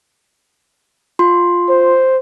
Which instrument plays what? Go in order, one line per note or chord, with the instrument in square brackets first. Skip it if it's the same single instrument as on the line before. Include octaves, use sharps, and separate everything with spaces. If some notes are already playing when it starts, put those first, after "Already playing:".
[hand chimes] F4 C6
[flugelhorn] C5